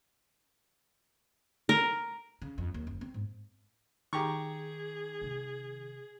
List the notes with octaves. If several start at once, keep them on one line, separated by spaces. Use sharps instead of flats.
A#4
C#3
F2
D#2
F#1
C4
G#2
D#3 G4 G#4 A#5 C#6
C3